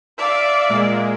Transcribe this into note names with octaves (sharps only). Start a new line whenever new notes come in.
D5 E5 F5
A#2 G#3 A#3